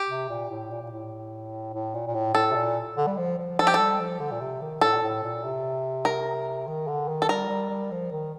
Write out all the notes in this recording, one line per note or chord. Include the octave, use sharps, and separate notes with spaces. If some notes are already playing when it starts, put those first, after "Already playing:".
Already playing: G4
C3
A#2
A2
A#2
A#2
A2
A2
A#2
A#2
A2
A2 A4
C3
A#2
D3
G3
F3
F3
F3 A4
G4
G3 A4
F3
D3
A#2
C3
D#3
A2 A4
A#2
A2
A#2
C3
A#4
D#3
D3
D#3
A4
G3 A#4
G3
G3
F3
D#3